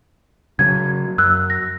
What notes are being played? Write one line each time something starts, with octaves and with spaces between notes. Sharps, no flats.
C#3 F#3 G#6
F#2 E6 F#6
A#6